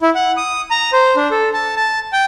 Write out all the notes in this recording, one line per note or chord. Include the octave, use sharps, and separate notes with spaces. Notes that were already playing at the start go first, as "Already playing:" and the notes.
E4
F#5
D#6
A#5
C5
D4
A4
A5
A5
G5